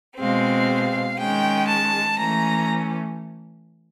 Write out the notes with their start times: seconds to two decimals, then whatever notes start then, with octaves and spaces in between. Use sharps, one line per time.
0.17 B2 G#3 C4 F5
1.18 D#3 G#3 C#4 G5
1.67 A5
2.17 E3 A3 C#4 A#5